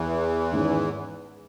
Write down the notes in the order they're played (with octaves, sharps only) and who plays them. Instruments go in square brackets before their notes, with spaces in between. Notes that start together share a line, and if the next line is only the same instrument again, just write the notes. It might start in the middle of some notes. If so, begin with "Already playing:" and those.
Already playing: [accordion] E2 E3
[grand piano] G#2 D#3 G#3 C#4